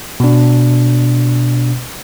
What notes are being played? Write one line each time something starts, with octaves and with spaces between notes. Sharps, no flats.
B2 D4